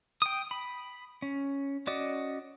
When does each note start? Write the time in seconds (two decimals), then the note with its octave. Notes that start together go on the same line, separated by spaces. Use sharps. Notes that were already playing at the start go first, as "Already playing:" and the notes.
0.22 G5 D#6
0.51 B5
1.22 C#4
1.87 C#4 F#4 D5 D#5